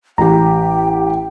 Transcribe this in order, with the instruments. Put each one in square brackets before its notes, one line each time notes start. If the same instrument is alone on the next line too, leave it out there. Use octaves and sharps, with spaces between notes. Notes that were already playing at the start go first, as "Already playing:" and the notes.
[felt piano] A1 G4 [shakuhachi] G5 [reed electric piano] A#5